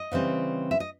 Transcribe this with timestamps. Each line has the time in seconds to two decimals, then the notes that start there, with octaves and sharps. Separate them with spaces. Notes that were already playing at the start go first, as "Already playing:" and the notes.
Already playing: D#5
0.12 C#3 E3 G3 C4
0.71 E5
0.80 D#5